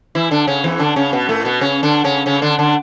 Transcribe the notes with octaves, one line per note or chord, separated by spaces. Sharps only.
E3 E4
D3 D4
C#3 C#4
E2 E3
D3 D4
C#3 C#4
B2 B3
A2 A3
B2 B3
C#3 C#4
D3 D4
C#3 C#4
C#3 C#4
D3 D4
D3 D4